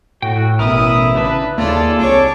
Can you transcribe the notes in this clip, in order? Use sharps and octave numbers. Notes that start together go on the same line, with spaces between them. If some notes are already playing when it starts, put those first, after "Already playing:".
A2 A3 F#4 G5
A1 B2 E4 A#4 D#6
C#3 D4 B4 A5
D#2 A#3 F4 G#4 A4 D5 A5
C2 D4 C#5 D6